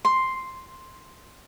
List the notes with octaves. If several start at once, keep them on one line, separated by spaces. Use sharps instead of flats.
C6